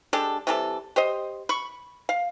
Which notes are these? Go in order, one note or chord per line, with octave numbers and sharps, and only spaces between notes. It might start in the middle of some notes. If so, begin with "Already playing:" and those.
G#3 D4 G4 A4
C3 E3 G3 A4
G4 C5 D#5
B5 C#6
F5